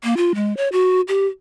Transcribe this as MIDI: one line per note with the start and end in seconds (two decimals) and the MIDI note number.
0.04 0.17 58
0.17 0.32 65
0.35 0.56 56
0.57 0.68 73
0.72 1.01 66
1.08 1.27 67